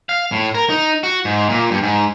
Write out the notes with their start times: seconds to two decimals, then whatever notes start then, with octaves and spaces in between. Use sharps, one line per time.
0.09 F5
0.32 A2
0.54 A#4
0.69 D#4
1.03 F#4
1.25 G#2
1.49 A#2
1.71 G2
1.83 G#2